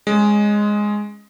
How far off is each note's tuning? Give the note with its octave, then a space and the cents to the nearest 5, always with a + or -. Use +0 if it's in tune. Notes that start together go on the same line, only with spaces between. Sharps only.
G#3 +0 C#4 +0